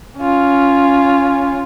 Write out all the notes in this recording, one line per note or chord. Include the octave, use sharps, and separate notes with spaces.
C#4 F4